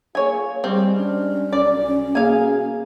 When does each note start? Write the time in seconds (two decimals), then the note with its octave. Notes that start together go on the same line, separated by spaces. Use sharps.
0.15 A#3 F4 G#4 C#5 G#5
0.64 G3 G#3 C4
0.96 C#4 D4 F6
1.53 B1 D5
2.15 B2 A#3 G#4 F5 G#5